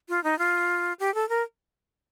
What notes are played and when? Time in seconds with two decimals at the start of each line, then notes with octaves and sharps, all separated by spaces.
0.09 F4
0.24 D#4
0.39 F4
0.99 G4
1.14 A4
1.29 A#4